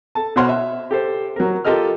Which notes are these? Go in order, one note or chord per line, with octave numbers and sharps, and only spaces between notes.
A4 A5
B2 C5 C#5 F#5 C6 F6
E5
G4 A4 C5
F#3 A#4
F4 G4 A4 A#4 D#5 F6